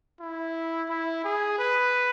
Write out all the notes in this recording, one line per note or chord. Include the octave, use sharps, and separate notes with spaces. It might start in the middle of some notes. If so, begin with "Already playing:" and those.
E4
E4
G#4
B4